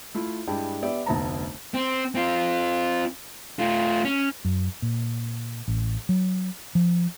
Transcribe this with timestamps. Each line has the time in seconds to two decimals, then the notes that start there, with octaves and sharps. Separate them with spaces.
0.14 A3 E4 F4
0.47 G2 G#3 D4 E4 G5 A5
0.82 B3 G4 D5 E5
1.06 F1 D2 B3 A5 A#5
1.74 C4
2.15 C4 F4
3.59 A3 F4
4.04 C#4
4.45 F#2
4.82 A#2
5.68 A1
6.09 F#3
6.75 F3